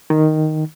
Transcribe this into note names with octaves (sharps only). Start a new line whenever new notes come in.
D#3